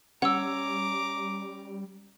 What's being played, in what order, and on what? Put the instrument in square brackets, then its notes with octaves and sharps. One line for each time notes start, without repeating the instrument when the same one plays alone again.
[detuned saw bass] G3 [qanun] C#4 [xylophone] F#5 E6 [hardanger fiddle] A#5 D6